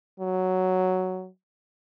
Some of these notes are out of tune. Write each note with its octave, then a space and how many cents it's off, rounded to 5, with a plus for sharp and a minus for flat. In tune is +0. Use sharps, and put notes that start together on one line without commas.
F#3 +5